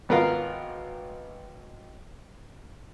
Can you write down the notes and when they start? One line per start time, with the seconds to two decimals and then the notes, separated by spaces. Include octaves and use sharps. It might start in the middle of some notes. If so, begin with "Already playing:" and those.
0.09 G#1 B3 F4 A#4 F5